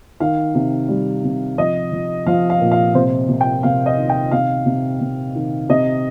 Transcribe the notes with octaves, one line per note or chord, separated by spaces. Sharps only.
D#3 F5
C3
G3
C3
F3 D#5
F3
F3 F5
F5
A#2
F5
C3 C5
C3
G5
C3 F5
D#5
D#3
G5
C3 F5
C3
C3
D#3
C3 D#5